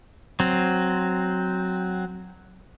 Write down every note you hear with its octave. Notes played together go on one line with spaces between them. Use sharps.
F#3 C4